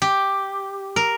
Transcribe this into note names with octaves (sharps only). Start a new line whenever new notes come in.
G4
A#4